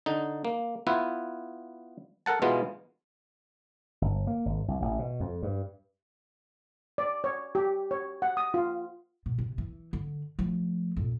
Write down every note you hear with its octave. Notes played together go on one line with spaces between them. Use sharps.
D3 D#4
A#3
B3 E4 F4 B4
A4 A#4 F#5 A5
B2 E3 G#3 B3 F4
G1
A#3
G#1
C2
A1
B2
F2
G2
D5
C#5
G4
C#5
F#5
D#6
F4
B2
C3
E3
D3
F3 A3
F2 A#2